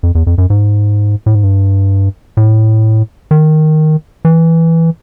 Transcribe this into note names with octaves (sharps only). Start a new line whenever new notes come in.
F2
E2
F2
F#2
G#2
A2
G#2
G2
A2
D#3
E3